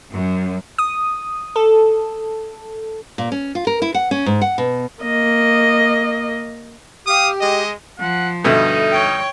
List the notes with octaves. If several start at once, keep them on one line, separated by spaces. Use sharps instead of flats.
F#2
D#6
A4
A#2
C#4
F4
A#4
E4
F#5
C#4
G#2
F#5
B2
A#3 D#5
G4 F5 D#6
G#3 D#5
F3 F#5
G2 B2 D3 D#4 A4 E5
C#5 G5